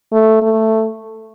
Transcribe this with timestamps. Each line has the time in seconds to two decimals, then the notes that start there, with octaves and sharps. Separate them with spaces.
0.12 A3
0.41 A3